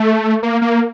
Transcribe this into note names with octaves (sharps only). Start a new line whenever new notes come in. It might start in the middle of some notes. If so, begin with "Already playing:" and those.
Already playing: A3
A#3
A#3